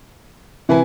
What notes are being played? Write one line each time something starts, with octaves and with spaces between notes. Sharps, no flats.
C3 E3 B4 G#5